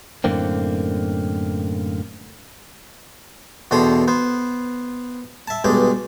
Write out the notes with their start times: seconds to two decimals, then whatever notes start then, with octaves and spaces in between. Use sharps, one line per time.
0.24 F#2 A2 D3 A#3 C4
3.71 E2 B2 D3 C5 G5 D#6
4.08 B3 C5
5.48 E5 A5
5.64 B1 G2 G#3 D5 G5